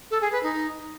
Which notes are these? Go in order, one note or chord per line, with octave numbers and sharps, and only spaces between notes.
A4
G#4
B4
D#4